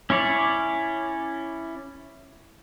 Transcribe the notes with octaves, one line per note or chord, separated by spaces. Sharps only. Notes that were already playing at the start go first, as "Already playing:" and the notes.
C#4 E4 C#5 D5